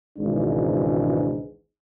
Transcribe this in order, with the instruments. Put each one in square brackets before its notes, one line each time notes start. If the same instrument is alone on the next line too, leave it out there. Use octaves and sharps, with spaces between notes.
[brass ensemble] G#1 C#2 G#2 B2 E3 D4